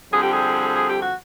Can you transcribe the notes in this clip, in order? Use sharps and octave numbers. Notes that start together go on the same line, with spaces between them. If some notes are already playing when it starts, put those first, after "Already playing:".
F2 D3 G3 C4 G#4
G4
G#4
G#4
G4
F#4